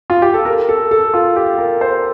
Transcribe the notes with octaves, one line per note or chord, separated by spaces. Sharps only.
F4
G4
A4
A#4
A4
A4
F4
G4
A#4
C5